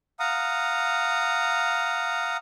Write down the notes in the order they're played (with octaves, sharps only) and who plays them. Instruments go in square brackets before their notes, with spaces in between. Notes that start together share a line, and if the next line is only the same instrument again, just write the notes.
[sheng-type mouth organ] F5 F#5 A#5 D#6